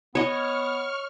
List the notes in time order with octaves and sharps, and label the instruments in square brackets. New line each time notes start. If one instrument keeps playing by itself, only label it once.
[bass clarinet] B3 [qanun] C#5 D#5 [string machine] C#6 F6